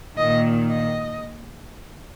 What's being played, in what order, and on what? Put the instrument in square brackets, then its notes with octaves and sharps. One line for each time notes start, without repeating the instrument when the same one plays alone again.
[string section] A#2 D#3 [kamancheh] D#5
[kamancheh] D#5